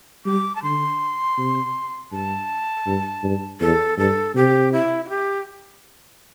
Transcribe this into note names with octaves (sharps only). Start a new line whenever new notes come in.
G3 D6
A5
D3 C6
C3
G2 A5
G2
G2
E2 A4
G2 A4
C3 G4
E4
E4
G4